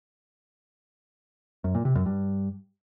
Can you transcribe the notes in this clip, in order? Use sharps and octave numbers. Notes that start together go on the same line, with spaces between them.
F#2
A#2
C3
F#2
G2